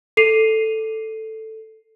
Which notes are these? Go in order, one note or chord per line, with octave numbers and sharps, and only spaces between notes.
A4 C7 D#7 F7